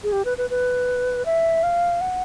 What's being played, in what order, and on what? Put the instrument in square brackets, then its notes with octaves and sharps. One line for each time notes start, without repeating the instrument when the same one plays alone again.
[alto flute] G#4
G4
B4
B4
B4
E5
F5
F#5